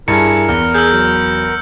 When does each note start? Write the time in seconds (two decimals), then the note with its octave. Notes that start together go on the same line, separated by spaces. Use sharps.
0.08 G2 E4 G#4 A#4 G#5 C#7
0.49 E2 F6
0.74 G#4 E6 G6
0.91 F#3